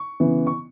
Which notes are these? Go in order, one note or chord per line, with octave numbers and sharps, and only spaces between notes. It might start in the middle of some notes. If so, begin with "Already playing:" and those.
Already playing: C#6
C#3 E3 B3
C#6